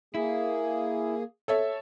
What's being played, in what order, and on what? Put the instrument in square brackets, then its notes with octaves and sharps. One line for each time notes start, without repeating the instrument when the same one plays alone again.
[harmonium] A#3 G#4 [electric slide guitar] E4
[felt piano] A4 C#5 E5